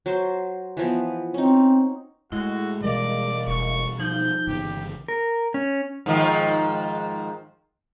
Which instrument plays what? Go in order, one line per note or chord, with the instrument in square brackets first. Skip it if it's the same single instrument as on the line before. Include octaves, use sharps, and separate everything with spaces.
[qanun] F#3 C5
E3 F3 B3
[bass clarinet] C4 [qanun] C#4 D#4
[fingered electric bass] A2 [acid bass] G#3 [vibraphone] E4 [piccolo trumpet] F#4
[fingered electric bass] B2 E3 G3 [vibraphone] A#4 D#5 F5 [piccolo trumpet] D5
[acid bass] E1 [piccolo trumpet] C#6
[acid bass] F3 [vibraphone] D#4 [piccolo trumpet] G6
[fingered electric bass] G1 C#3 E3 [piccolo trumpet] G4
[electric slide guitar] A#4
C#4
[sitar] G#2 D#3 F3